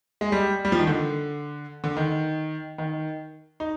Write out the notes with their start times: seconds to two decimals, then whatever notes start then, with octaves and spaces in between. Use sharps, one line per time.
0.21 G#3
0.32 G3
0.65 G3
0.72 F3
0.79 D#3
0.87 D3
1.84 D3
1.97 D#3
2.78 D#3
3.60 D#4